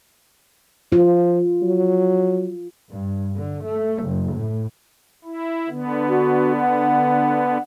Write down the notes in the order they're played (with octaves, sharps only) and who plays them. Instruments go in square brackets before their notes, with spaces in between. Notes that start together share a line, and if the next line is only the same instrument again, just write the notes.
[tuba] F3 [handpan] F4
[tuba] F#3
[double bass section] G2
D3
A3
F#1
A2
[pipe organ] E4
D3 B3
[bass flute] F#4
F#5